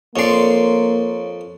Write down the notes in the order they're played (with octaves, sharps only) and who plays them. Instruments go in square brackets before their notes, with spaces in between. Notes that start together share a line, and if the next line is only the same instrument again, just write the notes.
[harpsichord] F2 D5 [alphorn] A#3 [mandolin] C#5 C6